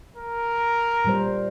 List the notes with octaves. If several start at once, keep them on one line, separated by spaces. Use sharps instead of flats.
A#4
A#2 G3 C5